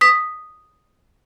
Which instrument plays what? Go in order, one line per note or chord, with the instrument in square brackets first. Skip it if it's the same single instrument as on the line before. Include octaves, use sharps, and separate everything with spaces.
[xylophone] D#6 B6